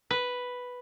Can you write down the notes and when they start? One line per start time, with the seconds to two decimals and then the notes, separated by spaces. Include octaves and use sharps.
0.11 B4